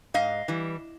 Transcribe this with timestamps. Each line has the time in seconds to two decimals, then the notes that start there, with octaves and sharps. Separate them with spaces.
0.14 G#2 D#5 F5
0.48 E3 G3